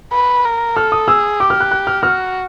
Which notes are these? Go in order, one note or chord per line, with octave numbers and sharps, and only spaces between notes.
B4
A#4
A4 F6
D#6
G#4 E6
G4 D6
F6
F#6
F#6
F6
F#4 F6